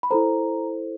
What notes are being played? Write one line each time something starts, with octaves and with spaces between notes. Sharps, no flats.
B5
E4 A4 C5 A#5